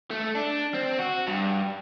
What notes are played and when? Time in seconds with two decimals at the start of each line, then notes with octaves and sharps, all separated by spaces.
0.11 A3
0.35 D4
0.74 C4
0.99 F#4
1.27 G2